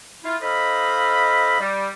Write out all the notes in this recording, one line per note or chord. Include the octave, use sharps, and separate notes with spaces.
E4 F4
D#4 A4 C5 D#5 F5 B5
G3